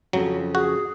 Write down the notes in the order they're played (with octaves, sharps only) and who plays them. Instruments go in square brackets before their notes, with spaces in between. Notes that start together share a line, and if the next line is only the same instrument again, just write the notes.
[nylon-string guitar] F2 C#3 [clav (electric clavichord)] F#3
[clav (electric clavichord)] F#4 [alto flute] G#4